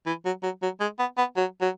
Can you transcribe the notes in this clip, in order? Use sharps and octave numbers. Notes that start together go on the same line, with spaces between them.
E3
F#3
F#3
F#3
G#3
B3
B3
F#3
F#3